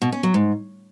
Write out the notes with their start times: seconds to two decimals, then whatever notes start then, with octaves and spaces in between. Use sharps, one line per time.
0.02 B2
0.12 C#4
0.23 F#3
0.34 G#2